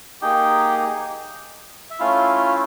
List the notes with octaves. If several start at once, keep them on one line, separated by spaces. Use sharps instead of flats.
A#3 D#4 G4 G#4 G5
E5
A3 C#4 E4 F4 F5